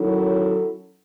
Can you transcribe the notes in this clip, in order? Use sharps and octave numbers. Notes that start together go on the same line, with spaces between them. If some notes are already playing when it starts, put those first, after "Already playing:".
Already playing: D#3 F#3 C#4 E4 A4